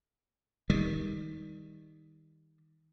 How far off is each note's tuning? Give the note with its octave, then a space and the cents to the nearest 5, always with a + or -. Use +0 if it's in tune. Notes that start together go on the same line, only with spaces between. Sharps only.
D#3 +20 G3 +20